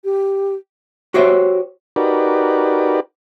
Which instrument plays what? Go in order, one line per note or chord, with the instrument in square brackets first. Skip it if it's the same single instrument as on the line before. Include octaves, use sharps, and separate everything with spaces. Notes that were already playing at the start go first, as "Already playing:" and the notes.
[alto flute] G4
[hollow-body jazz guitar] F#4 G4 C5 C#5 E5
[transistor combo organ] D#4 F#4 G4 A#4 B4 D5